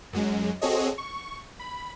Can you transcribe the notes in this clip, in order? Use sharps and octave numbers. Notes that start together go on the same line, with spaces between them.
F#2 F#3 G#3
C4 F#4 G#4 A4 C#5 D#5
C#6
B5